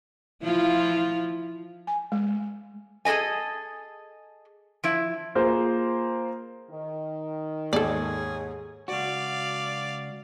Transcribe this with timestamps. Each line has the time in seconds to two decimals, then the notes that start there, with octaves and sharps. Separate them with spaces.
0.43 F3 E4 F4
1.87 G#5
2.12 G#3
3.05 G#4 A4 B4 D#5 G#5
4.84 F3 E4
5.35 A#3 F4 G#4 C5
6.71 D#3
7.73 D#2 G#2 G#4 A4 D5
8.88 C#2 F#4 D5 F5